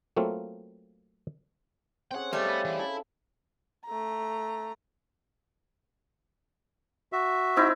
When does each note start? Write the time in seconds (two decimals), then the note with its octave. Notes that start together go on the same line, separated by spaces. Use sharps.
0.17 F#3 A3 A#3 C4 F4
2.11 C4 C#4 G#4 F#5 G5
2.33 G3 A3 B3 C#5 E5 F5
2.49 B3
2.65 E3
2.79 C#4 E4 A4
3.86 A3 A#5
7.12 F#4 E5
7.56 C4 D#4 E4